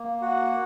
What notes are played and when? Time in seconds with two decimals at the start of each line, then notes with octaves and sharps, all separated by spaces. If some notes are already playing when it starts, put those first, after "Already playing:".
Already playing: A#3
0.21 F#4 F#5